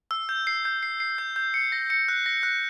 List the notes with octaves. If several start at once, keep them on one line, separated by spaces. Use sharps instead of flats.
E6
G6
C7
G6
C7
C7
G6
G6
C#7
A#6
C#7
F#6
A#6
F#6